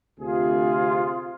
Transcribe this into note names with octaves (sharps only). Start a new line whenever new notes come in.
D2 C3 F4 G#4